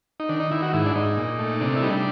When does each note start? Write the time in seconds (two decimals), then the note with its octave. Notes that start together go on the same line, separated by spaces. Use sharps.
0.20 D#4
0.29 D#3 D4
0.40 D#4
0.51 D#3 E4
0.62 F#4
0.73 G#2 E4
0.86 D4
0.95 G#2 D#4
1.17 A#2
1.39 A3
1.61 C3 D4
1.76 E4
1.83 G3 D#4
1.90 D4